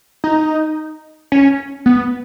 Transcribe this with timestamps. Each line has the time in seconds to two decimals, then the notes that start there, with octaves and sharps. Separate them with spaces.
0.24 D#4
1.32 C#4
1.86 B3